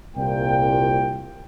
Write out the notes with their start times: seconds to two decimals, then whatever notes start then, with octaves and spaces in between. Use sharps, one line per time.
0.16 C2 A#2 G5